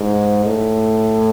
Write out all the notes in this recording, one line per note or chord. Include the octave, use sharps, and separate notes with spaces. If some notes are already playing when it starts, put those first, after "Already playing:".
Already playing: G#2
A2